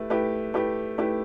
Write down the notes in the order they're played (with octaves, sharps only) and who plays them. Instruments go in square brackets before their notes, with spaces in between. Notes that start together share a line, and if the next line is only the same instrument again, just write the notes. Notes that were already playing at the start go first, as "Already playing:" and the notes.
Already playing: [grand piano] A3 E4 G4 B4
A3 E4 G4 B4
A3 E4 G4 B4
A3 E4 G4 B4